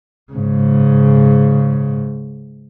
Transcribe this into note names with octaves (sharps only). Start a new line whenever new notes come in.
G#2 C#3